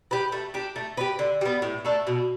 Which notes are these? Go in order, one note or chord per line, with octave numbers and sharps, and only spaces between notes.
G4 B4
A3
D4 G4
A3
G4 B4
D3
G3 B3
A2
A3 D4 A4
B2